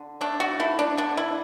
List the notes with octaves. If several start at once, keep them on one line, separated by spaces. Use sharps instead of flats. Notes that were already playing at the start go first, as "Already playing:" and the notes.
Already playing: D3
A3 D4
F#4
A3 E4
D4
D3 D4
E4